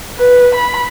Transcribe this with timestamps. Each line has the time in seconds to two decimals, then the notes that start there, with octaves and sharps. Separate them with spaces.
0.17 B4
0.55 B5